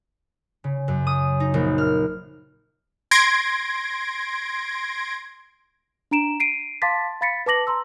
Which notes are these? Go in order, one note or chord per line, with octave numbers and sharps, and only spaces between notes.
C#3
F#2
D#6
D#4
A#1
F6
C6 G#6 A#6 D7
D4 A#5 D7 E7
C7 D7 D#7
F5 A5 C6 D6 A6 B6
F5 B5 A6 B6 C#7
B4 A5 D6 A#6 F#7
A#5 C6 E6